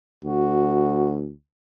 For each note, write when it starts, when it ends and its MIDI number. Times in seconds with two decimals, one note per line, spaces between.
0.25 1.31 38
0.25 1.20 66